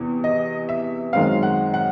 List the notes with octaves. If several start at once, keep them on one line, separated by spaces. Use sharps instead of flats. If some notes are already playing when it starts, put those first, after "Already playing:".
Already playing: E2 C3 E3
D#5
E5
F#2 D#3 G#3 C4 F5
F#5
F#5